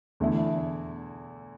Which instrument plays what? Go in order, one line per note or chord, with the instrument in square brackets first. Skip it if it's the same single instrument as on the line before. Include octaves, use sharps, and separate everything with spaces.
[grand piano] E2 D3 A3 E4